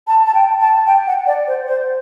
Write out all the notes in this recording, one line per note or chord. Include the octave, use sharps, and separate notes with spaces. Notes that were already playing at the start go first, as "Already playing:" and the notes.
A5
A5
G5
A5
G5
F#5
D5
C5
C5